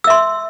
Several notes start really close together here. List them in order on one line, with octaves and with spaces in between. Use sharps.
E6 E5 C6